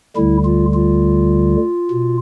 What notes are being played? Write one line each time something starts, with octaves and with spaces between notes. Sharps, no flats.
D2 D3 G3 E4
F4
F4
B2